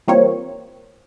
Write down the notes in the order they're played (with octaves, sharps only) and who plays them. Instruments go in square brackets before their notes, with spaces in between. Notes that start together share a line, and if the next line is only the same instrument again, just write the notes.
[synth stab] E3 G3 A#3 C4 F4 C#5